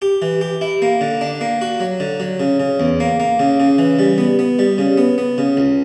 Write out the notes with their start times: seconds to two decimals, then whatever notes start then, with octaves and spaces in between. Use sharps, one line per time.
0.02 G4
0.22 E3
0.41 G4
0.61 E4
0.82 A#3
1.01 D3
1.21 D4
1.41 A#3
1.61 F#4
1.80 F#3
2.00 D3
2.20 F#3
2.40 C#3
2.60 C#3
2.80 E2
3.00 A#3
3.20 A#3
3.39 C#3
3.60 C#3
3.78 E3
3.99 G3
4.18 B3
4.39 B3
4.59 G3
4.78 C#3
4.98 B3
5.18 B3
5.38 C#3
5.57 C#2